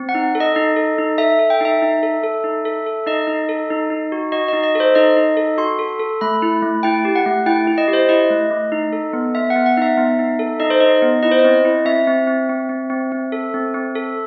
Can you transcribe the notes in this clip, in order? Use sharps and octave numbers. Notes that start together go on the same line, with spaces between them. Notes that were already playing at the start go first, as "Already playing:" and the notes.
Already playing: C4
F#5
D#4
A4
D#5
D#4
A4
D#4
A4 E5
A4
G5
D#4 E5
D#4
A4
A4
D#4
A4
A4
D#4 D#5
D#4
A4
D#4
D#4
F#4
F#4 D#5
D#4 D#5
D#5
A4
C5
D#4 D#5
D#4
A4
F#4 C6
A4
A4
A3 B5
E4
A3
E4 G5
G4
F#5
A3
E4 G5
E4
D#5
G4
C5
E4 D#5
A3
A3
D#4
A4
B3
B3 E5
F#5
B3
F#5
D#4 E5
B3
D#4
A4
D#4 D#5
C5
D#4 D#5
B3
E4 D#5
C5
D#5
C4
E4
C4 E5
C4
C4
C4
C4
C4
C4
A4
C4
C4
A4